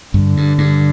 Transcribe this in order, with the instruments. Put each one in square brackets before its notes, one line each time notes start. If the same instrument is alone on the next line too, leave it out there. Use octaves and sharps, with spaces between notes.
[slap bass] G2 [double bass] D3
[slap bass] G2
G2